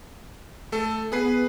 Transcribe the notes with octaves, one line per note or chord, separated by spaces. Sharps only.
A3 A4
B3 G#4 B4 C7